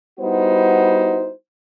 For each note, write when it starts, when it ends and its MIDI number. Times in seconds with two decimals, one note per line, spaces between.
0.19 1.29 55
0.19 1.29 59
0.19 1.29 63
0.19 1.29 64
0.19 1.29 66
0.19 1.29 72